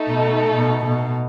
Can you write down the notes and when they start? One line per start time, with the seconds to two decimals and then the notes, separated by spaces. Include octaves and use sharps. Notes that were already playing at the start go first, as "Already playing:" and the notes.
Already playing: A3 D#4 A4
0.09 B2
0.55 B2
0.86 B2